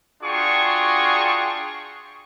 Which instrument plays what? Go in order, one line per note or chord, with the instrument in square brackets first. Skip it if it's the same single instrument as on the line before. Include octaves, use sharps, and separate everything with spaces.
[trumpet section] D4 F4 F#4 G#4 G5 C#6